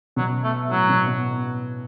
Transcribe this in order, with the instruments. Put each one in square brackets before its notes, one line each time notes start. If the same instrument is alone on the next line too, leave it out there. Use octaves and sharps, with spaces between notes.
[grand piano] B2 [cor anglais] F#3
[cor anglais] A3
[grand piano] A2 [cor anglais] F#3
[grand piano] B2
B2